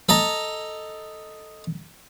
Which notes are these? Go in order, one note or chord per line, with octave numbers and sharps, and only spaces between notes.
A4 D#5 A#5